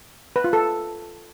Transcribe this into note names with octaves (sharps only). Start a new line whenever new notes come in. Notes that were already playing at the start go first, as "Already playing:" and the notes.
B4
F4
A4